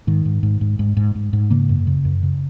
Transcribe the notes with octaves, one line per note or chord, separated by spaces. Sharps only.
G#2 D#3
G#2
G#2
G#2
G#2
G#2
G#2
G#2
C#3 A#3
F#2
C#3
F#2
C#3